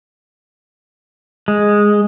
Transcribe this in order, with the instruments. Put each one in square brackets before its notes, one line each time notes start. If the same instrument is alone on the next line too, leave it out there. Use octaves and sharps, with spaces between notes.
[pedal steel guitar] G#3